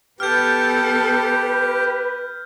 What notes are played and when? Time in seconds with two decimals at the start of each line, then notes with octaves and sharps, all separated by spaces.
0.20 B3 G4 A4 B4 F6 G6